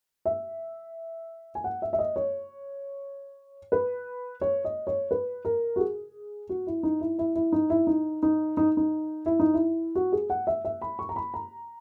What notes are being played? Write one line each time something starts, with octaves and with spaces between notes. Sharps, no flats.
E5
G#5
F#5
E5
E5
D#5
C#5
B4
C#5
D#5
C#5
B4
A#4
F#4
G#4
F#4
E4
D#4
E4
E4
E4
D#4
E4
D#4
D#4
D#4
D#4
E4
D#4
E4
F#4
G#4
F#5
E5
E5
B5
C#6
A#5
B5
A#5